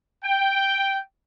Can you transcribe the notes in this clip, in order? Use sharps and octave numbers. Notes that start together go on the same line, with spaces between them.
G5